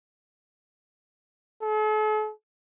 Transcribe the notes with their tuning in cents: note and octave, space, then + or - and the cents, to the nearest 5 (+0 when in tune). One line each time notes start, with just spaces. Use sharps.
A4 -45